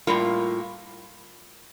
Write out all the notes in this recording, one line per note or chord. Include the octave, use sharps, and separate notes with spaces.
A2 G3 A#3 F4